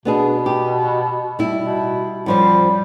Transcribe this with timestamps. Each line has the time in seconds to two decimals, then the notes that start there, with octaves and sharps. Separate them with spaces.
0.05 B2 B3 D4 G#4
0.46 G4
1.39 G3 E4
1.64 B2
2.26 F#2 F3 G3 C5